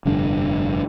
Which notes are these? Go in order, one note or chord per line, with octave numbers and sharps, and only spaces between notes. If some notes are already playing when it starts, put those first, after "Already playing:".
F1 G2 D3 D4